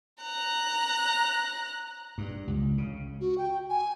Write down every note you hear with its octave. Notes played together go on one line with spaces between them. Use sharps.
A#5 F#6
G2
C#2
C#3
F#4
G5
G#5